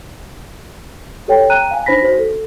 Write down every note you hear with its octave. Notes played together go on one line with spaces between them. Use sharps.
G4 A4 C#5 G5
G5 A#5 F#6 D#7
F5 G#5
D4 D#4 C5 B5 A#6 B6
F#4 C5
A4